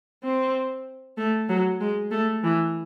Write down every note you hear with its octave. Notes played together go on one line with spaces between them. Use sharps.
C4
A3
F#3
G#3
A3
E3